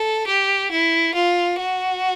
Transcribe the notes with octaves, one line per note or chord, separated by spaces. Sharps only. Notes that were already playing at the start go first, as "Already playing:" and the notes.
Already playing: A4
G4
E4
F4
F#4